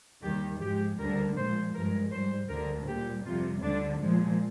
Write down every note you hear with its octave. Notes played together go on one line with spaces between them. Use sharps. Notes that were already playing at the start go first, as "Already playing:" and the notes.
D#2 D#3 G3 G4
G#2 F3 G#3 G4
D2 D3 G3 A#4
A#2 F3 G#3 C5
G2 F3 G#3 A#4
G#2 G3 C5
D2 D3 G3 A#4
A#2 G3 G4
F2 C3 G3 F4
D2 D3 G3 D4
A#2 F3 G#3